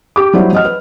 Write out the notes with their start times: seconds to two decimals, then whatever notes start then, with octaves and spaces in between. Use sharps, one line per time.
0.16 G4 D6
0.34 F#3 G3 E4 G4 C5
0.53 F#3 D#5 F6
0.65 B4